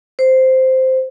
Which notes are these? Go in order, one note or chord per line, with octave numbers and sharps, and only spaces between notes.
C5